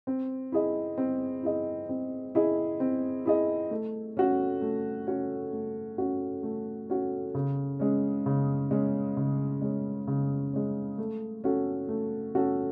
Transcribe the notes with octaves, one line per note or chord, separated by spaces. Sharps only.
C4
E4 G#4 D#5
C4
E4 G#4 D#5
C4
E4 G#4 D#5
C4
E4 G#4 D#5
A3
C#4 F#4
A3
C#4 F#4
A3
C#4 F#4
A3
C#4 F#4
C#3
G#3 C#4
C#3
G#3 C#4
C#3
G#3 C#4
C#3
G#3 C#4
A3
C#4 F#4 A4
A3
C#4 F#4 A4